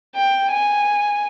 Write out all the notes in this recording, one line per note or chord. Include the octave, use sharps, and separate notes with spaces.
G5
G#5